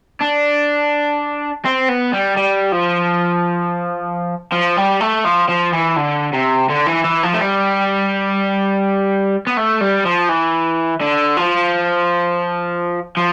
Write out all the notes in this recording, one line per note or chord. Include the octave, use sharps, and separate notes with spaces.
D4
C4
B3
G3
G3
F3
F3
G3
A3
F3
F3
E3
D3
C3
D3
E3
E3
F3
A3
G3
B3
A3
G3
F3
E3
D3
F3
F3